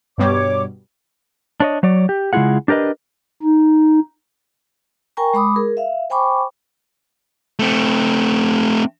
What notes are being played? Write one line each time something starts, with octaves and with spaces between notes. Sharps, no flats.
G2 B2 G3 C#5 D6
D4 C#5 D#5
F#3 C#5 D5
G4
C#3 G#3 E4 F4 G#4 F#5
D4 G4 A#4 B4 D#5
D#4
A#4 G5 G#5 A#5 C#6
G#3 B5 D6 D#6
G#4 A#4
E5 F5
C5 G5 G#5 B5 C#6 D6
A3 C4